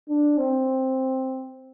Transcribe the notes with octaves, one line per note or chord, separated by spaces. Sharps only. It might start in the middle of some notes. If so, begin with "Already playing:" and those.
D4
C4